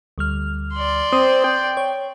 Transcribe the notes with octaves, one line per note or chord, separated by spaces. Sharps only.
D2 G3 F6
D5 C6
C4 D#6
G5
C#5